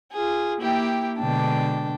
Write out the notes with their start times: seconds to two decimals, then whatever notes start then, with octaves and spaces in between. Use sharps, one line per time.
0.13 F4 G#4
0.60 A#3 E4 G4 G5
1.19 B2 D3 G#3 D4 G5 A5